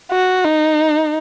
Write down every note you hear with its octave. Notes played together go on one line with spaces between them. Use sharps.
F#4
D#4